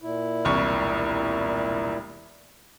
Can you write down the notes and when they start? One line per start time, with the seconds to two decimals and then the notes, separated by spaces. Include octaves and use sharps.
0.02 A#2 E4
0.45 E1 C2 C#6